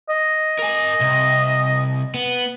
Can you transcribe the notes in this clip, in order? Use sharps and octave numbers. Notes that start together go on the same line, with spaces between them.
D#5
A#4 G#5
C2
B3